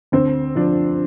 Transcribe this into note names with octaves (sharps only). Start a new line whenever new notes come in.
D2 C4
F3 D4